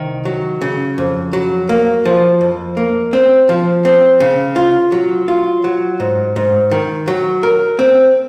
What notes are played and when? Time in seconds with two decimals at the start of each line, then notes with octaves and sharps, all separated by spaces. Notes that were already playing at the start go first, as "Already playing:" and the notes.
Already playing: C2 D#3
0.25 F#3
0.61 C#3
0.98 F2
1.33 F#3
1.69 A#3
2.05 F3
2.41 F2
2.77 A#3
3.13 C4
3.49 F3
3.85 C4
4.20 C#3
4.56 F4
4.92 F#3
5.28 F4
5.64 F#3
6.00 G#2
6.36 G#2
6.71 D#3
7.08 F#3
7.43 A#4
7.79 C4